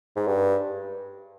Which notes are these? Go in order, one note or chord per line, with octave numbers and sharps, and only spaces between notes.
G#2
G2